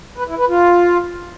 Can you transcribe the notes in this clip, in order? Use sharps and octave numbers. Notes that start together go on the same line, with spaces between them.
B4
E4
B4
F4